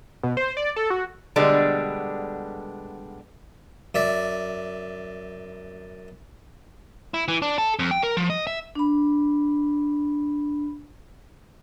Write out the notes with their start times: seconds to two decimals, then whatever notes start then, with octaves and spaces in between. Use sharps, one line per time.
0.23 B2
0.37 C5
0.57 D5
0.76 A4
0.90 F#4
1.36 B2 D3 G3 G#3 B3 D4
3.95 F#2 D5 E5
7.14 E4
7.28 E3
7.42 D4
7.58 A4
7.79 F2
7.91 G5
8.03 A#4
8.17 F3
8.30 D#5
8.47 E5
8.75 D4 B5